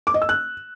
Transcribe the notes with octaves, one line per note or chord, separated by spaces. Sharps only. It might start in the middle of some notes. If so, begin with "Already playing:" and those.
D6
D#5
E6
F#6